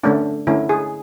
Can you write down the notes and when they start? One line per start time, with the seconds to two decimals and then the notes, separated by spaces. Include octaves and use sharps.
0.03 D3 A3 C#4 D4
0.47 D3 A3 C#4 E4
0.69 G#4